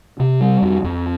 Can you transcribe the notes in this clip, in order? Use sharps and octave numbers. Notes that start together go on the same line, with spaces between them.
C3
G3
F2
F2